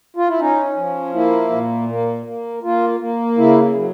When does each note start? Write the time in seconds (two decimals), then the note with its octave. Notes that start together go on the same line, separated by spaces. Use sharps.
0.16 F4
0.28 E4
0.39 C#4 D#4
0.77 F3
1.14 A#3 E4
1.51 A#2
1.89 A#3
2.26 A#3
2.63 A#3 F4
3.00 A#3
3.38 C#3 E4
3.75 F#3